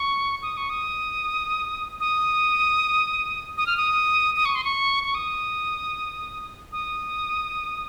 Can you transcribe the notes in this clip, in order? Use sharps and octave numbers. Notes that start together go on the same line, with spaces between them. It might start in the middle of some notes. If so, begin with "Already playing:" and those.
Already playing: C#6
D#6
C#6
D#6
D#6
D#6
F6
D#6
D#6
C#6
C6
C#6
C#6
D#6
D#6